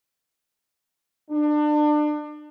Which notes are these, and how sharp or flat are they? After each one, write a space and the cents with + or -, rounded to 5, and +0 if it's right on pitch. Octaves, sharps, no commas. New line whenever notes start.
D4 +30